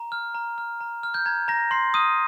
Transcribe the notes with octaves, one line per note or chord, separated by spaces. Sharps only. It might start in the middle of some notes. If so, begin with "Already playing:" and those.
Already playing: A#5
F6
A#5
F6
A#5
F6
G6
A#5 G#6
A#5 F6 A#6
A#5 C6 C7
D#6 F6 D#7